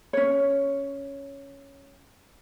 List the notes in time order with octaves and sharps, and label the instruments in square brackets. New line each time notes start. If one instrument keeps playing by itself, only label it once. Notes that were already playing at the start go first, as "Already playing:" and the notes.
[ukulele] C#4 C#5